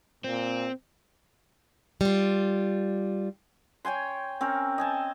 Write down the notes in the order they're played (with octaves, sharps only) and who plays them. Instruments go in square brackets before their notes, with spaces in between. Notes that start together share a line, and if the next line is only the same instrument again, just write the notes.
[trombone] A#2 [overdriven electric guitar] C4
[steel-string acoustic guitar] G3 F4
[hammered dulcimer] C#5 G5 G#5 C6
C4 C#4 A#4
D#5 G#5 A5